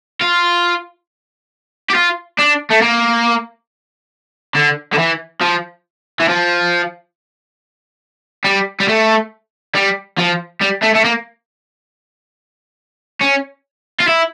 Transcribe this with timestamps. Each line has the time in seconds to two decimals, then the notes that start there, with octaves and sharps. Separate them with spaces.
0.21 F4
1.90 G4
1.95 F4
2.38 D4
2.70 A3
2.81 A#3
4.55 D3
4.93 D3
4.98 E3
5.41 F3
6.20 E3
6.28 F3
8.44 G3
8.80 G3
8.88 A3
9.75 G3
10.18 F3
10.61 G3
10.83 A3
10.95 A3
11.04 A#3
13.21 C#4
14.00 F4
14.08 E4